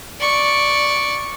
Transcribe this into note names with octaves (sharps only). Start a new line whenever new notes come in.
D5 C#6